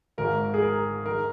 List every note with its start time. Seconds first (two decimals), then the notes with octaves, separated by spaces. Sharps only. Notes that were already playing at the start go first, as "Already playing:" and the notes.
0.18 G#1 G#2 D#3 A#4
0.54 G#4
0.62 A#4
1.06 D#3 A#4